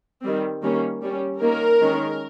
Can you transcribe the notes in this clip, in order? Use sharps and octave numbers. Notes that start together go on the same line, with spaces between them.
D#3 G3 C4
D#3 G3 A#3 C#4
G3 C#4
D#3 A#3 C#4 A#4
D#3 G#3 C#4